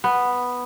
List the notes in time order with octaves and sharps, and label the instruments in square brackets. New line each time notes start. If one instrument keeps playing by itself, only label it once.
[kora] B3